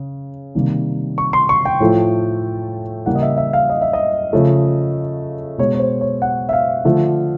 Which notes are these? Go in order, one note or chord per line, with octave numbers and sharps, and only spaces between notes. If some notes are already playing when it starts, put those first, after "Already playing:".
Already playing: C#3
C3 D#3 G3 A#3
C#6
C6
C#6
G5
A2 F3 A3
C#3 E3 G3 A#3 F#5
D#5
E5
E5
F5
D#5
E5
D#5
C#3 F3 A3
B2 G#3 C#5
C#5
C5
C#5
F#5
E5
F5
D3 F3 A3